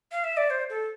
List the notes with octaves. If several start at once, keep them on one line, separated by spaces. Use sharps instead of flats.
F5
E5
D5
C5
A4